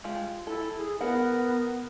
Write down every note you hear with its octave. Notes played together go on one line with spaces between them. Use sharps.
G#3 F4 G4
E4 A4
G#4
B3 E4 A#4 F#5